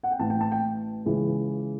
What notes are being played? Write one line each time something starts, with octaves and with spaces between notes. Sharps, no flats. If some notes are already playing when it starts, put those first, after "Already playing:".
F#5
G5
A1 A2 E3 A5
G5
A5
G5
C#2 C#3 E3